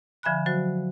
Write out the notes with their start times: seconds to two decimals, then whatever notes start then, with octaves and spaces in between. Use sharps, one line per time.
0.23 D3 F3 E5 G#5 B5 F#6
0.46 F#3 F#4 C5